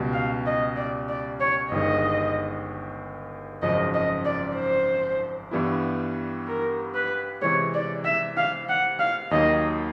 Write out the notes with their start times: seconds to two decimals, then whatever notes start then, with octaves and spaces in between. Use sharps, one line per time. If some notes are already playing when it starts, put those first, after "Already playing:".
Already playing: C#2 B2 G3
0.13 F5
0.46 D#5
0.77 D5
1.09 D5
1.40 C#5
1.71 G1 G2 D#3 G#3 D#5
3.62 G#1 F#2 C#3 F3 D#5
3.94 D#5
4.25 D5
4.57 C5
5.51 G2 E3 G3 B3 E4
6.47 A#4
6.94 B4
7.42 C3 E3 G#3 C#5
7.74 D5
8.05 E5
8.37 F5
8.69 F#5
8.99 F5
9.31 D#2 D#3 F#3 A#3 D#5